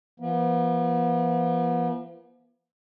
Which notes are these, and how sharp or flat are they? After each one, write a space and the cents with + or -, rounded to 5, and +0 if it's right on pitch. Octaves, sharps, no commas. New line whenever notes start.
F3 -45 B3 -40